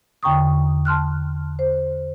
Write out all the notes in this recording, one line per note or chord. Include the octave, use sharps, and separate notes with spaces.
E2 D3 G5 A#5 C#6 D#6
A5 C6 F6 F#6
C5